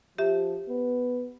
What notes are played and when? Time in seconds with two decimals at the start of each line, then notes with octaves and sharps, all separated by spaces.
0.18 F3 G4 E5
0.69 B3